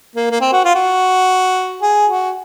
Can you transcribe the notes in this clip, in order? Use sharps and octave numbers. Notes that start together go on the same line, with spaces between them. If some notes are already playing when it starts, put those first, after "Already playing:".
A#3
A#3
C4
F#4
F4
F#4
G#4
F#4